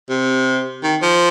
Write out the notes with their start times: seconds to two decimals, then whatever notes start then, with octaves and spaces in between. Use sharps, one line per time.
0.09 C3
0.83 D#3
1.02 F3